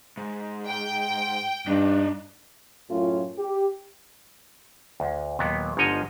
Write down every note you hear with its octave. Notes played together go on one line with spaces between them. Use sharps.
G#2
G5
G2 D4 D#4
F#2 A2 C#4 F4
G4
D2
D#2 A#2 F#3 B3
G1 G#2 F3 C#5 D#5